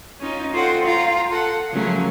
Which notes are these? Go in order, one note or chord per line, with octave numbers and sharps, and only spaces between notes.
C#4 D#4 F4
F4 F#4 A4 C5 F#5 G5
F4 F5 G5 A#5
A4 F#5
C#3 F3 F#3 A3 A#3 C#4